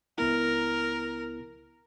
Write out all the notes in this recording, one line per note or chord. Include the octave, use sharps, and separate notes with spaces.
C#2 B3 E4 A#4